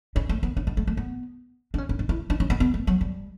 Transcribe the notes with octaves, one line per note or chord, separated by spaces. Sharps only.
C#4
A3
B3
D4
B3
A3
A3
B3
D4
C#4
C#4
D4
E4
D4
C#4
B3
B3
A3
F#3
G3